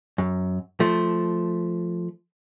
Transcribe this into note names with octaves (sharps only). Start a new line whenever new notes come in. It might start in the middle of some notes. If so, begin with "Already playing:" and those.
F#2
F3 A3